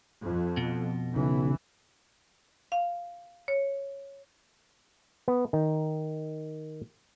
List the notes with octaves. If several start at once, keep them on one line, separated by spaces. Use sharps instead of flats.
F2
B2
B1 C#3 E3
F5
C#5
B3
D#3